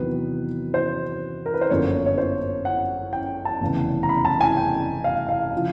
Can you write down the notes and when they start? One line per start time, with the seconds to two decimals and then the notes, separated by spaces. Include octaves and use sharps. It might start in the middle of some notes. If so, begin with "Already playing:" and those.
Already playing: E2 C3 D#3 F#3 B3 B4
0.74 C5
1.46 A#4
1.54 B4
1.61 C5
1.70 G1 F#2 D3 F3 A#3 C#5
2.06 C#5
2.18 C5
2.65 F#5
3.13 G5
3.45 A5
3.61 F1 E2 C#3
4.03 A#5
4.09 B5
4.25 A5
4.41 G#5
4.57 G5
5.04 F5
5.29 F5
5.55 C#3 F3